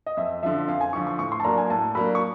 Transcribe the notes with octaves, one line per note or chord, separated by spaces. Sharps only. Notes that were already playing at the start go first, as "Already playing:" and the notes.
D#5
F2 E5
D3 F3 E5
F2 F5
G#5
D3 F3 C#6
C#6
A2 C#6
C6
A5
F#3 A#3 D4 A#5
G#5
A2 A5
F#3 A#3 D4 B5
C#6